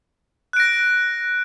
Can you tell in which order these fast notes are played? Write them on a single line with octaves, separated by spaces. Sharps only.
F#6 D7 A#6